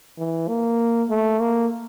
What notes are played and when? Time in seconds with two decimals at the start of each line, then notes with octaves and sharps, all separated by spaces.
0.18 E3
0.48 A#3
1.10 A3
1.40 A#3